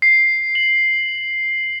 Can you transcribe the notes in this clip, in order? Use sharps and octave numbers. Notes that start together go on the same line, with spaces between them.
C7
F#7